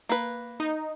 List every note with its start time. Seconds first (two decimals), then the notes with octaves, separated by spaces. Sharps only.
0.09 A#3 B4
0.60 D#4